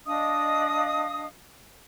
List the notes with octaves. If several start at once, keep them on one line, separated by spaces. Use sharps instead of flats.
D4 D#5 F5 D#6